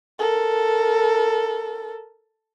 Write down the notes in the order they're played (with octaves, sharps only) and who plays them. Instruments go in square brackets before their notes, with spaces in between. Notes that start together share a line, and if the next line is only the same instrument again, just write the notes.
[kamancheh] A4 A#4